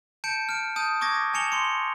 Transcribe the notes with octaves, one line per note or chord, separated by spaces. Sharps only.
A5 G6 C#7 D7
F6 D7
A5 D#6 G6 D#7
C#6 D6 G#6 A#6
G#5 A5 C#7 F7 G7
C6 C#7